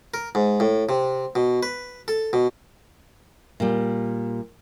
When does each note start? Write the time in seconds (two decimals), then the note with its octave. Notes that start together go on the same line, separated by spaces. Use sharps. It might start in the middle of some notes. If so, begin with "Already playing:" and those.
0.14 A#4
0.35 G#2
0.60 A2
0.89 C3
1.35 B2
1.63 B4
2.08 A4
2.33 B2
3.60 A#2 G3